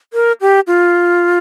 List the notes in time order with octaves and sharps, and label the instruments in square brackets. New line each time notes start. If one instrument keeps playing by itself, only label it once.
[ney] A#4
G4
F4